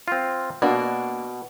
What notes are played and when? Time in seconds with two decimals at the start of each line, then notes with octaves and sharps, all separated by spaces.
0.08 C4 F4
0.62 B2 A#3 D4 F#4